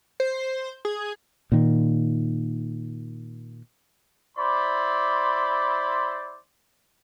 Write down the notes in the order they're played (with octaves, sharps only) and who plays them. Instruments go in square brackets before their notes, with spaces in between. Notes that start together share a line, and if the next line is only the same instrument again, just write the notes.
[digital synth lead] C5
G#4
[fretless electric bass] A#2 D#3
[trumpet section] E4 C5 D5 B5 C6 D6